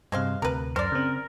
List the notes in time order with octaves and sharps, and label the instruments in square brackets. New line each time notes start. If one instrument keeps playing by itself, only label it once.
[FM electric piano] G2 C3 [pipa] G#3 C5 F5
[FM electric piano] D2 C3 [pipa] A#4 B4
[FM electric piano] F#2 [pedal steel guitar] A#4 [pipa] C5 D5
[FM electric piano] C#3 C4